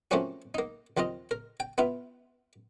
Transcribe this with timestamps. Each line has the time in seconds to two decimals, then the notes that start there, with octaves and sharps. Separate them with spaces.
0.11 F3 A3 A#3 C4 C#4 F#4
0.54 A#3 D#4
0.97 D#2 F3 C4 F4 D#5
1.31 A#4
1.60 G5
1.78 B3 E4 F4 E5